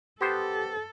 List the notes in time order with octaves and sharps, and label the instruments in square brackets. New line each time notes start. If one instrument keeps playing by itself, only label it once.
[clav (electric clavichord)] B3 C5 [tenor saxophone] G4 [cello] A4